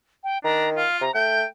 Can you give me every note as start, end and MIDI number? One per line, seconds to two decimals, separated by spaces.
0.24 0.38 79
0.44 0.84 51
0.44 0.67 62
0.44 0.70 82
0.76 1.02 65
0.76 1.00 77
1.01 1.09 48
1.01 1.11 82
1.15 1.44 57
1.15 1.46 79
1.15 1.41 91